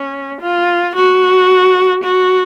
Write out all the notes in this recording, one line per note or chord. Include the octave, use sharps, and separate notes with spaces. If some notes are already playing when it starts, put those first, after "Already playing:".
Already playing: C#4
F4
F#4
F#4